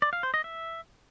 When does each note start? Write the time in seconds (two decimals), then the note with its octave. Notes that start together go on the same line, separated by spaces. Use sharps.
0.02 D5
0.13 F5
0.23 C5
0.34 D#5
0.44 E5